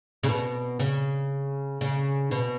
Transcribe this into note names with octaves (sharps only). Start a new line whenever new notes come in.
C#3
B2
C#3
C#3
B2